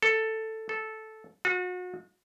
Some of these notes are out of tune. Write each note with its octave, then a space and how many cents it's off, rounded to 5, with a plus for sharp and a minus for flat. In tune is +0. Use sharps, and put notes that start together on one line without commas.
A4 +5
A4 -10
F#4 -35